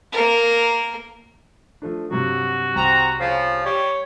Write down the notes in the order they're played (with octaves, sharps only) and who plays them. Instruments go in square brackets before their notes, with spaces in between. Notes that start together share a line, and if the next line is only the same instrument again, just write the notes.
[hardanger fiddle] A#3 A#4
[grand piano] F3 A3 D4
[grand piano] G2 C3 F#3 [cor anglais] F#4
[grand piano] C2 [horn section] C4 A#5
[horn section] C#3 F3
[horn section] G3 [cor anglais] C#5